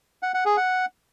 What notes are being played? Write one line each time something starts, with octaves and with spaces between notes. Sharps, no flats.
F#5
F#5
G#4
F#5